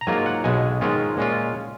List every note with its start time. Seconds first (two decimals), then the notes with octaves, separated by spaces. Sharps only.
0.01 A#5
0.07 G#2 F#3 A#3 F4 G#5
0.26 F#5
0.44 B1 B2 G#3 G#5
0.81 G#2 D#3 G#3 C#4 F4
1.17 A#2 G#3 C#4 F4